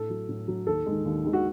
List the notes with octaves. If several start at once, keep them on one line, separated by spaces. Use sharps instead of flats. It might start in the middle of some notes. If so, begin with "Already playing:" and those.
Already playing: A2 A4
F#3
A2
F#3
D#2 A4
D#3 G#3
D#2
D#3 G#3
F#4